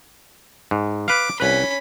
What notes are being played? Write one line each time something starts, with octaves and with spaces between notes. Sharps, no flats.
G#2
B4 F5 D6
C2 C#4 B4 B5